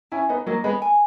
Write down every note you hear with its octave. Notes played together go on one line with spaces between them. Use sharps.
C#4 E4 G#5
B3 D#4 B4
F#3 A#3 D#5
G#3 B3 B5
G#5